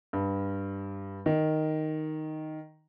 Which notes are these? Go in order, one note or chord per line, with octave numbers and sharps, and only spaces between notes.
G2
D#3